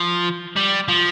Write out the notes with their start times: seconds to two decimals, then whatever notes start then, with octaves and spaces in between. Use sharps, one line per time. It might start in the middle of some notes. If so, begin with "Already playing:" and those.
Already playing: F3
0.57 G3
0.89 F3